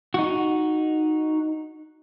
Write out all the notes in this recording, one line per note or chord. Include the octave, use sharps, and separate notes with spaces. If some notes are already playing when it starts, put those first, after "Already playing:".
D#4 F#4